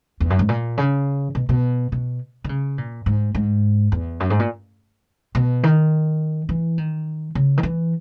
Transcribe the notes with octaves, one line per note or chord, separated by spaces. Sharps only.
E2
F#2
G#2
A#2
C#3
B2
B2
B2
D#3
C#3
A#2
G#2
G#2
E2
F#2
G#2
A#2
B2
D#3
E3
D#3
C#3
D#3
E3